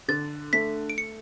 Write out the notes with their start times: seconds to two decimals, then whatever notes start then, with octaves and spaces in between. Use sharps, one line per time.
0.08 D3 A6
0.53 A3 B6
0.90 D7
0.98 C#7